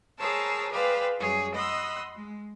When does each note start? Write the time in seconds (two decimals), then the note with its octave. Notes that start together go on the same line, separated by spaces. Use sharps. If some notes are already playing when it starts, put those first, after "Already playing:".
0.19 G#4 A#4 C5 C#5 A5 E6
0.70 G#4 B4 C5 D5 F5 G5
1.19 F#2 G3 G#4 C#5
1.54 D#5 F#5 B5 C6 D#6 E6
2.16 G#3